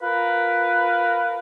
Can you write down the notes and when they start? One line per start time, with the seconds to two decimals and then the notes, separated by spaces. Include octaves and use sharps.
0.01 F4 A#4 B4